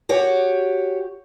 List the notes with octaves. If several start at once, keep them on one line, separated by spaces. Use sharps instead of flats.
F#4 G4 C#5